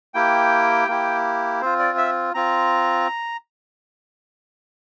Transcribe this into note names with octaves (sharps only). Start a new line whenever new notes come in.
A#3 E4 G4 G5
A#3 E4 G4
C4 F4 C5
D5
E5
C4 F4 A#5